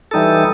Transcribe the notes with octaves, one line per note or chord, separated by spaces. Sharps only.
E3 G3 D#4 A4